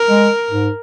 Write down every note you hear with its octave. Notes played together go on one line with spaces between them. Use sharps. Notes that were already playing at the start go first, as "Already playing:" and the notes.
Already playing: A#4
G#3
G#2